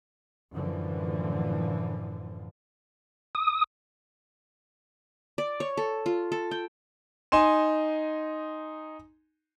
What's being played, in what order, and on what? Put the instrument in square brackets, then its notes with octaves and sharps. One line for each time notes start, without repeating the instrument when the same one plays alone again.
[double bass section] F#2 A2 D3 E3 F3
[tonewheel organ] D#6
[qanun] D5
C#5
A4
F4
A4
G5
[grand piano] D#4 G#5 C6 E7